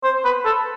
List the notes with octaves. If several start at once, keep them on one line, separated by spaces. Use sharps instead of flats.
C5
B4
A4